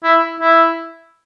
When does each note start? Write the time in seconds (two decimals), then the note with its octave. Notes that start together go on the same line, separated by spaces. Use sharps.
0.04 E4
0.40 E4